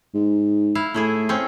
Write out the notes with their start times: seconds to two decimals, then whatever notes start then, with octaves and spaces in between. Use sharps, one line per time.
0.14 G#2
0.75 E4 F5
0.94 A2 A3 E4 G#4
1.29 C4 C#4